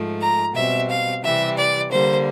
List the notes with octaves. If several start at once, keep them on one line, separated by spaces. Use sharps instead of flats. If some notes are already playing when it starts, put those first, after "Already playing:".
Already playing: G#2 F3 A3
A#5
B2 G3 C4 E5
F5
C3 E3 G3 E5
D5
D3 G3 A#3 C5